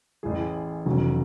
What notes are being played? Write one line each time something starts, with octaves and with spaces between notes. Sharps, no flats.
A1 A2 E3 G#4
F1 E2 C#3 F#3